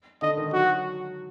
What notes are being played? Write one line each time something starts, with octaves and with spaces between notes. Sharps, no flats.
D3 D#5
D#3
F#3 F#4